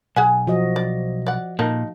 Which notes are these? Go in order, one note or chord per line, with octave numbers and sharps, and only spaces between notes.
B1 G#4 F#5 G#5
F3 F#4 D#5
D5
D5 F#5
A#2 A#3 D#4 A4